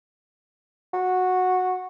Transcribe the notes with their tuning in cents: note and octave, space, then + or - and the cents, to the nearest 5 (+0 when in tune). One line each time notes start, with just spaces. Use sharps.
F#4 -10